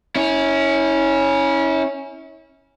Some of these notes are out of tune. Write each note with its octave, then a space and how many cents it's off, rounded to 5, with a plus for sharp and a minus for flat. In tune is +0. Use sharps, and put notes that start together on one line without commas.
C#4 +0 E4 -35